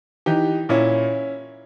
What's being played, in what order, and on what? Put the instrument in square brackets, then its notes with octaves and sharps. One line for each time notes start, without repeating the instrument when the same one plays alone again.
[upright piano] E3 D#4 G4
A#2 C#4 E4